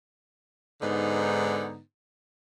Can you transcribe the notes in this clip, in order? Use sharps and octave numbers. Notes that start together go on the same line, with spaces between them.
G#2 D3 B3 D#4